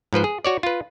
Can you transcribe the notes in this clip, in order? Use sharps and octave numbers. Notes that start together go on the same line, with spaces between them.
G#2 F3 B4 C5
G#4
F#4 C#5 D5
F4 B4